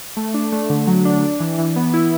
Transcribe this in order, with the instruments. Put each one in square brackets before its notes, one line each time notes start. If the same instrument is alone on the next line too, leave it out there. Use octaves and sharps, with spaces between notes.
[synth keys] A3
D4
A3
D3
F#3
D4
D4
E3
E3
B3
E4